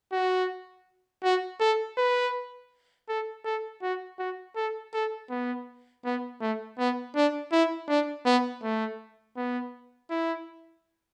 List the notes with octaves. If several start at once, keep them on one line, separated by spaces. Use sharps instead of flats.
F#4
F#4
A4
B4
A4
A4
F#4
F#4
A4
A4
B3
B3
A3
B3
D4
E4
D4
B3
A3
B3
E4